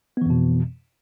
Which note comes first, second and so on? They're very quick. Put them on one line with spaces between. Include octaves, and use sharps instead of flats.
B3 E3 F2 B2